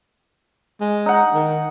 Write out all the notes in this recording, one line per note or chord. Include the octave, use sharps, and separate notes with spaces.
G#3
D#4 F#5
D#3